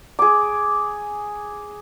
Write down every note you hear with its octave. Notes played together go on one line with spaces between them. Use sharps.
G#4 D6